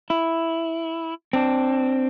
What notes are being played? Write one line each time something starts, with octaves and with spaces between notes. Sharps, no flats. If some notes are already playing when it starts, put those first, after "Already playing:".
E4
C4 D4